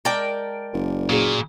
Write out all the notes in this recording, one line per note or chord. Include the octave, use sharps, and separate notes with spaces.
G#3 A#4 D5 G5 A5
F#1
A#2 A#3 F#4 G#4